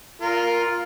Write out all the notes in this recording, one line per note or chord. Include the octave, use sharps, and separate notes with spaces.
F4 A#4